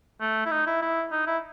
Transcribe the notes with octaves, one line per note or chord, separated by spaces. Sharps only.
A3
E4
D#4
E4
E4
D#4
E4